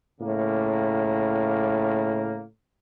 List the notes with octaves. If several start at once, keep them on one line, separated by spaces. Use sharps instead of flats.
A2 C#3 A#3